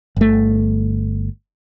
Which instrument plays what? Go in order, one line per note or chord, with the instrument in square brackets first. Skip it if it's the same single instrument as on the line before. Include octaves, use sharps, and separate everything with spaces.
[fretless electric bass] G1 A3